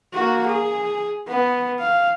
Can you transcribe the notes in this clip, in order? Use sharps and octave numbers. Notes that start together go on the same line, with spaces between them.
A#3 F#4
G#4
B3
F5